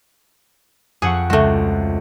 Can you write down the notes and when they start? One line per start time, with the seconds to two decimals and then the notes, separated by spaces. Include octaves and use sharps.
1.02 F2 G#4 F#5 C#6
1.30 C#2 G#3 A3 F#4